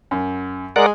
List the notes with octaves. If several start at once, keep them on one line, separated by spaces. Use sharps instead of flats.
F#2
G#3 A#4 D5 F#5